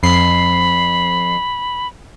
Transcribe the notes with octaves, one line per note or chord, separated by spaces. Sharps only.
F2 B5 C7